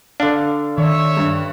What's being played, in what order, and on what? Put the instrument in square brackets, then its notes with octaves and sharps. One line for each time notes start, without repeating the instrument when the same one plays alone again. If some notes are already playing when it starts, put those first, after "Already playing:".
[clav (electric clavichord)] D3 D4 [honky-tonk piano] F5
[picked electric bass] D#3 [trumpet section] C#5 E5 [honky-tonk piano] D5
[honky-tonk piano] G2